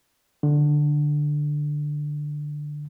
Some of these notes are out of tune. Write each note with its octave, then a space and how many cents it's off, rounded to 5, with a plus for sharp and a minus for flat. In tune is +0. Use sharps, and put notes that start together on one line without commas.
D3 +10